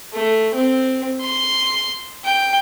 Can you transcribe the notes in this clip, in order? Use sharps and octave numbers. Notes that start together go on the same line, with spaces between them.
A3
C4
C6
G5